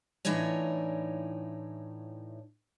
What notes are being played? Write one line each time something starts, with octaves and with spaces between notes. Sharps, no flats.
A2 E3 D4 D#4 C#5 G#5